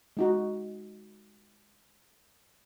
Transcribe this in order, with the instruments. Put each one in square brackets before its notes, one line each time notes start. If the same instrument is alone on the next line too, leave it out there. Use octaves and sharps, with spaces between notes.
[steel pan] G#3 D#4 F#4